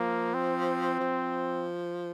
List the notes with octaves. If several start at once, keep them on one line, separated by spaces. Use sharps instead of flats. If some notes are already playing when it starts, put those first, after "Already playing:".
Already playing: F3 A#3
C4
F3